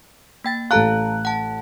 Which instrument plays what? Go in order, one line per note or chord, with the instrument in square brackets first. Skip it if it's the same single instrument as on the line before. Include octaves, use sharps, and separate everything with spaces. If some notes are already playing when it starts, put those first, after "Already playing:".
[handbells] A#3 G5 A6
[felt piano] A1 A4 F#6 [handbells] F5 A5 A#5
[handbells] F#5 A5